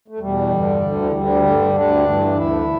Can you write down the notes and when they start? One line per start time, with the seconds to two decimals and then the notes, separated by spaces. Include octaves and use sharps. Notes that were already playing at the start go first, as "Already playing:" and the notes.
0.08 A3
0.20 E2 B2 G3
0.50 G2 D3
0.81 D2 D3
1.02 E3
1.12 D2 D3 G3
1.42 G2 D3
1.73 D2 D3 D4
2.04 G2 E3
2.34 D2 D3 E4